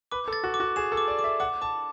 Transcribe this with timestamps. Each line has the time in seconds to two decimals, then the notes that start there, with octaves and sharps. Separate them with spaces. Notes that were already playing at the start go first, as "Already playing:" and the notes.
0.12 B4 D6
0.28 A4
0.33 A6
0.44 F#4
0.54 D6
0.60 F#4
0.76 G#4 E7
0.92 A4
0.97 D6
1.08 D5
1.19 D6
1.24 E5
1.40 F#5 D6
1.62 A5 D6